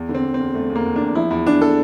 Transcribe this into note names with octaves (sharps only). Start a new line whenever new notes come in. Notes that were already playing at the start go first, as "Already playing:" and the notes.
Already playing: E2
D3
C4
E2
C4
E2
E2 A3
E2
A#3
E2
E2 D4
F3 E4
E2 E4
E2 D4
A4